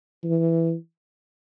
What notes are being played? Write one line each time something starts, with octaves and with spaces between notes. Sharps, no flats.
E3